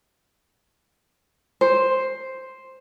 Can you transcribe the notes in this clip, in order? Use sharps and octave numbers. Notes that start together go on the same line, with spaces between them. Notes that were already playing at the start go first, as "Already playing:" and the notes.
C5